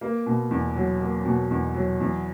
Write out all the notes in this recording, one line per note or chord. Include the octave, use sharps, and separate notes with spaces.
A#3
B2
E2
F#3
A#3
B2
E2
F#3
E2